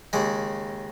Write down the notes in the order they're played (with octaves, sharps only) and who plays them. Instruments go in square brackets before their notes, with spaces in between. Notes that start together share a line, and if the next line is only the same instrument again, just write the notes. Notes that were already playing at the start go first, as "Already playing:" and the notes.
[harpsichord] D#2 C#3 G#3